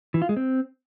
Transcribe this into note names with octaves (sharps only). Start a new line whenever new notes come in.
E3
F4
G#3
C4